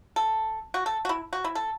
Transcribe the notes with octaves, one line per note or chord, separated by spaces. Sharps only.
A4
F#4
A4
F#4
E4
F#4
E4
A4